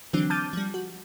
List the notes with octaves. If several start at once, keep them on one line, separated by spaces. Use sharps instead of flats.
D3 E3 F#3 C4 D4
A5 D6 F6 G6 A6 D#7
F3 G3
F#4